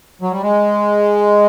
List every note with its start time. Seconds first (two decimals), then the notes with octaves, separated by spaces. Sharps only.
0.22 F#3
0.31 G3
0.42 G#3